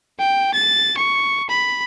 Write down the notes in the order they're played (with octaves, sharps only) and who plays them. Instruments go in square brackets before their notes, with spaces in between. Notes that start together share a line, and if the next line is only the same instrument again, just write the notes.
[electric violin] G5
A6
C#6
B5